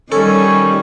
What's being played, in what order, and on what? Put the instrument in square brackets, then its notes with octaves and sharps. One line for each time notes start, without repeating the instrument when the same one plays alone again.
[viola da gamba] D#3 G3 [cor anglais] C#4 [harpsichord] A4